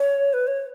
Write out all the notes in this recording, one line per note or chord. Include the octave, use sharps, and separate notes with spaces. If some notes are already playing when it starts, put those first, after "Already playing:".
Already playing: C#5
B4
C#5